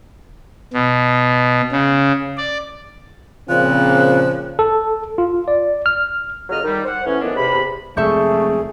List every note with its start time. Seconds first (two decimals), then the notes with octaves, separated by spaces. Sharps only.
0.73 B2
1.71 C#3
2.37 D5
3.49 A#2 C#3 F3 C4 F#6
4.59 A4
5.18 F4
5.48 D5
5.86 F6
6.49 A#2 C#3 F#3 A4 D#5 F6
6.64 D#3 G3
6.85 C5 F#5
7.06 A2 E3 B3 C#4
7.21 A2 D#3 F3 B3 D4
7.36 E2 C3 B5
7.97 F2 C3 G#3 A3 G#4 E5 C#6 G6